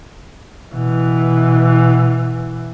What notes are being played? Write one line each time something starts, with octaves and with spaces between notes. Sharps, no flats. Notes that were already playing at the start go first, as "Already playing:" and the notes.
B2 E3